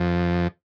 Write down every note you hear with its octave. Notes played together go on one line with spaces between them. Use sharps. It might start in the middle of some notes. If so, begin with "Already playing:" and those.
Already playing: F2